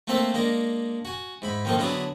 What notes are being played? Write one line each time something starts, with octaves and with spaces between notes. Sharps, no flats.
A3 A#3 C4 A4 C5 E5
G#3 A#3 D4 A#4
F#4 G#5
G#2 E4 B5
D#3 F3 A#3 F4 A4
D3 F#3 B3 D4 E4 G#4